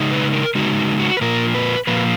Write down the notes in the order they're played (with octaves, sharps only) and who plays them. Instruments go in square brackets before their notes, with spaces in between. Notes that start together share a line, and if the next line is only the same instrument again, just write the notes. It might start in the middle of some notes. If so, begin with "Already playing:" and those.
Already playing: [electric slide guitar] C#3 G#3 D#4
B4
A#4
C#3 G#3 D#4 F#4
F#4
F#4
B4
A#2 F3 A#3 F4 A#4
B4
A#2 F3 A#3 F4 B4